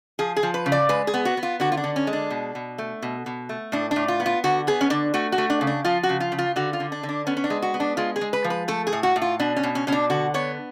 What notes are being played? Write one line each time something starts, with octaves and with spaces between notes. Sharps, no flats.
F3 G#4
G#4
F3
B4
C#3
D5
G#3 B4
G#4
B3
F#4
B3
F4
D3 F#4
F4
D4
D3
C#4
G#3
D4
B2
B2
A3
B2
B2
A3
A2 D4
D4
A2
F4
B3
F4
D3 F#4
B3 G#4
C#4
D3 D4
A3 F#4
F#4
A3
D4
C#3
D4
F3 F4
F#4
C#3
F4
C#3
F4
D3 F#4
F4
D3
D4
D3
D4
B3 C#4
C#4
D4
G#3
F#4
B3
D4
G#3 F4
G#4
G#3
B4
F3
B4
A3 A4
G#4
A2
F#4
A2
F4
B2 D4
C#4
B2
C#4
B2 C#4
D4
D3 F#4
B3 C#5